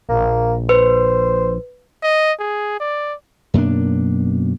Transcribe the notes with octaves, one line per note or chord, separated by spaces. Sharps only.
A#1 A#3
B4 C5
D#5
G#4
D5
F#2 B2 A#3 D4